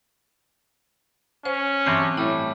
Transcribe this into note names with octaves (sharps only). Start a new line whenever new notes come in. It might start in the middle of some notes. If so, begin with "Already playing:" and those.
C#4 C5
G2 E3 F#3 C4 D4 C5
A2 G3 E4